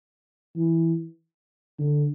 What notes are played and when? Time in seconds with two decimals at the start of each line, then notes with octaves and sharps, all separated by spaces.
0.56 E3
1.79 D3